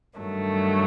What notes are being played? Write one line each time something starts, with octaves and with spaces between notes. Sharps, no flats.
G2 D#3 F#3 A3